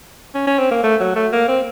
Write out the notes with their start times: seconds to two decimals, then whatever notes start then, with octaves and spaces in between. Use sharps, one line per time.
0.35 C#4
0.47 C#4
0.59 C4
0.71 A#3
0.83 A3
1.00 F#3
1.16 A3
1.33 A#3
1.48 C4